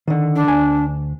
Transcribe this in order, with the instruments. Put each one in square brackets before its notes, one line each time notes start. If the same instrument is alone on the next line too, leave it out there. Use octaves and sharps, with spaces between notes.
[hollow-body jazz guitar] D3 D#3
[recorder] D4
[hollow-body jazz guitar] D2 G#5